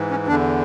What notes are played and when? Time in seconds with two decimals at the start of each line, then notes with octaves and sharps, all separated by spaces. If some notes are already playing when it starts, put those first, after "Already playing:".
Already playing: G#2 E3
0.11 C#4
0.27 E2 D4
0.31 D3